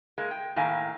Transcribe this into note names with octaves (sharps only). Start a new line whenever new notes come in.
G#3 A#3
G5
A2 D#3 A#3 F5 G#5